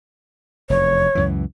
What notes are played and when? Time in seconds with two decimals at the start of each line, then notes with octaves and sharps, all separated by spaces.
0.70 F1 E2 C#5
1.15 C#2 F#2 E3